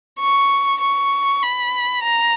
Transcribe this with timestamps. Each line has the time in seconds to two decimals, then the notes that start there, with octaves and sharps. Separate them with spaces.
0.20 C#6
0.81 C#6
1.43 B5
2.04 A#5